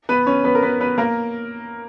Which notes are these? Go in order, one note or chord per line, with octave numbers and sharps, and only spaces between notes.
B3 B4
C#4 C#5
B3 B4
A#4
B3 B4
B3 B4
A#3 A#4